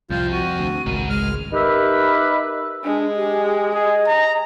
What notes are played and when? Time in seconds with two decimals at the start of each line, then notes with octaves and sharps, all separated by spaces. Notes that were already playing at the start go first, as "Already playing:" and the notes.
0.10 C2 F2 C4 F4 G6
0.32 F#4 D#7
0.59 D2
0.86 G#1 C#2 F#4 A#4
1.10 G#3 F6
1.53 D#4 G4 A#4 B4 E5
2.84 G#3 D4
3.16 G4
3.74 G#4 D#5
4.07 A#5